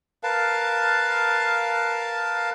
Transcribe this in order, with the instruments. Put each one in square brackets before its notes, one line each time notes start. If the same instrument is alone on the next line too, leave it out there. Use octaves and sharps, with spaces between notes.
[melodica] A#4 B4 F5 A5